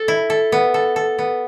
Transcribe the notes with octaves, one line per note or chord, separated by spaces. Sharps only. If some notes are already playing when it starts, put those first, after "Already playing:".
Already playing: A4
E4
A4
B3
A4
A4
B3